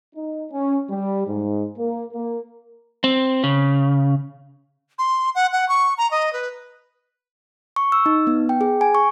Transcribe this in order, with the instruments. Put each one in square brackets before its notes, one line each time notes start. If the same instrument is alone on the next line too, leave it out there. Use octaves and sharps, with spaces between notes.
[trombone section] D#4
C#4
G3
G#2
A#3
A#3
[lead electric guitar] C4
C#3
[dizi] C6
F#5
F#5
C#6
A#5
D#5
B4
[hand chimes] C#6
E6
D#4
B3
G5
G#4
G#5
C#6